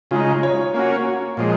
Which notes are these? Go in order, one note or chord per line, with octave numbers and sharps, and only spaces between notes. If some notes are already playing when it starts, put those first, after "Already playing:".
C#3 G#3 D#4 F4
C#5
A#3 C#4 F#4
F#4
A#2 F3 G#3